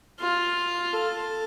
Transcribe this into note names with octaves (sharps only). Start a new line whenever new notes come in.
F4
A4